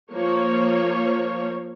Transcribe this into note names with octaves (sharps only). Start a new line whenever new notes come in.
F3 A#3 C#5